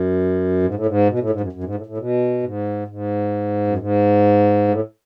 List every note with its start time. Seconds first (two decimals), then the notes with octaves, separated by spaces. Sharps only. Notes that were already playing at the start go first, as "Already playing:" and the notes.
Already playing: F#2
0.63 G#2
0.74 A2
0.86 G#2
1.08 B2
1.19 A2
1.30 G#2
1.40 F#2
1.53 F#2
1.64 G#2
1.75 A2
1.86 A2
1.98 B2
2.42 G#2
2.88 G#2
3.67 F#2
3.78 G#2
4.68 A2